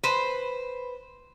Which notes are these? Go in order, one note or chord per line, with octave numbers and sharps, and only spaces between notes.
B4 C5